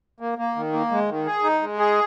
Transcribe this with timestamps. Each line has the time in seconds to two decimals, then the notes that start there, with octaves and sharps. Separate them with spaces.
0.20 A#3
0.38 A#3
0.56 D#3
0.73 A#3
0.91 G#3
1.09 D#3
1.26 G#4
1.44 D#4
1.62 G#3
1.79 G#4